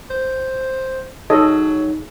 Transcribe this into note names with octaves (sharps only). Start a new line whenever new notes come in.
C5
F#3 D#4 G#4 A4 C#5 D#5